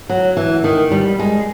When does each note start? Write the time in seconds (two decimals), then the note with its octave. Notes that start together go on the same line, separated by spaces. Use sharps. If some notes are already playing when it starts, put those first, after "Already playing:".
0.09 F#3
0.37 E3
0.64 D#3
0.91 G3
1.19 G#3